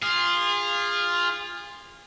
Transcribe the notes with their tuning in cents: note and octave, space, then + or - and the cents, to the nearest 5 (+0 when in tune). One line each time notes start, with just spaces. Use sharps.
F4 +0 G#4 -30